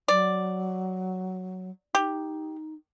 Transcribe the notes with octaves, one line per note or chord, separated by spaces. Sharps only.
F#3 D5
D#4 G4